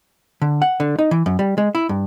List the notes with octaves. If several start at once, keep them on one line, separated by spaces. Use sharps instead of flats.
D3
F#5
D3
D#4
E3
F#2
G3
G#3
E4
G2